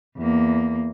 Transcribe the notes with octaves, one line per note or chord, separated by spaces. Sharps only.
E2 A#3